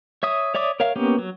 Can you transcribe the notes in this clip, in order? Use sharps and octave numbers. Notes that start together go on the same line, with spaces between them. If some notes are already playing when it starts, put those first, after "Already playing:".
C#5 E5 D#6
C#5 D5 E5 D6 D#6
A#4 C#5 E5 F5
A#3 B3 C#4 G4
F#3